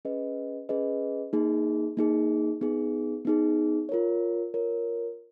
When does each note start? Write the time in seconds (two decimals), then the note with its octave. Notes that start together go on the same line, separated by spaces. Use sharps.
0.05 C#4 G#4 B4 D#5
0.69 C#4 G#4 B4 D#5
1.33 A#3 D#4 G#4
1.97 A#3 D#4 G#4
2.61 B3 D#4 G#4
3.25 B3 D#4 G#4
3.89 F4 A#4 C#5
4.54 F4 A#4 C#5